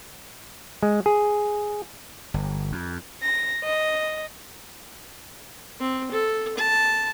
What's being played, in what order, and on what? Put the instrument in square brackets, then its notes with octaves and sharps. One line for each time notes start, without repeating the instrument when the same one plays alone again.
[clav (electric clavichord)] G#3
G#4
[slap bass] G1
F2
[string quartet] A#6
D#5
[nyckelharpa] C4
A4
A5